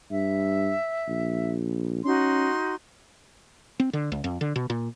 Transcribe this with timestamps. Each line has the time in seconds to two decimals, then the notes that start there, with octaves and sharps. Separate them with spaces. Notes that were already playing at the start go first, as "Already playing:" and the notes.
0.11 G2 E5
1.08 A#1
2.05 C#4 D#4 F#4 C6
3.80 C4
3.93 D3
4.12 C#2
4.24 F2
4.41 D3
4.56 B2
4.70 A#2